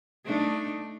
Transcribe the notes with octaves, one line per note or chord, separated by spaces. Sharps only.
A3 D4 D#4